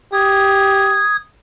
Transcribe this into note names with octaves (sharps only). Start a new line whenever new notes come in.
G4 D#6 G#6